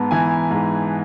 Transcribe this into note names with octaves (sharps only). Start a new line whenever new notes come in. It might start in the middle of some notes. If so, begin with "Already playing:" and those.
Already playing: G#2 B3 A5
E3 G#5
G#2